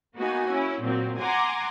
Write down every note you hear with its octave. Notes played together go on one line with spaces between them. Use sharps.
A#3 B3 D#4 F#4 G#5
C#4 E4
A#2 F#3 C4
F#5 G#5 A#5 C6 D6